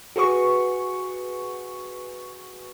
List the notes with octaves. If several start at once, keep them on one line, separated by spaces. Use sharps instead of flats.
F#4 G#4 B4 C#6